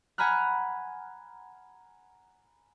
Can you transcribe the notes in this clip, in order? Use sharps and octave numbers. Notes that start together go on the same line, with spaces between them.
F#5 G#5 A#5 B5 F6 F#6